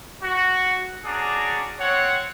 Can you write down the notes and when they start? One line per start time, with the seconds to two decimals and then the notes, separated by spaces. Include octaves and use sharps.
0.23 F#4
1.06 C#4 D4 F#4 G#4 D5 A#5
1.80 C4 C#5 F#5